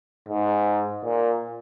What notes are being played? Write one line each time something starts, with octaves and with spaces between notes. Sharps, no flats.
G#2
A#2